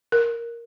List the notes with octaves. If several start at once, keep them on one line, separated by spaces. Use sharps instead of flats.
A#4